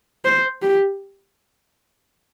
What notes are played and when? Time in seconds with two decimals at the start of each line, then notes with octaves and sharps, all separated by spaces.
0.25 C5
0.62 G4